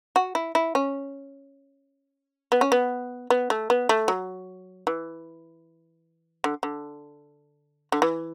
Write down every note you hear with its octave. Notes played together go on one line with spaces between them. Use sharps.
F#4
E4
E4
C#4
B3
C#4
B3
B3
A3
B3
A3
F#3
E3
D3
D3
D3
E3